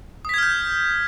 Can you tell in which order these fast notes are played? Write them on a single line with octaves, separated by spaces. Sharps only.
D#6 B6 G#6 F6 G6